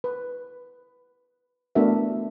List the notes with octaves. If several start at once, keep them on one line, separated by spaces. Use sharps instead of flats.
B4
A3 B3 D4 F#4 A#4 E5